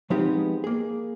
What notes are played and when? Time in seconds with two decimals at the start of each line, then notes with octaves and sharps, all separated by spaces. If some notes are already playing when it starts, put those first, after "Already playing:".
0.10 F3 G#3 B3 C4 D#4 G4
0.64 A#3 G#4